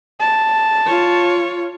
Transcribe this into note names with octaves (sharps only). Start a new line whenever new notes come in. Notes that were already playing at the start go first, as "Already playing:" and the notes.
A5
F4 C#5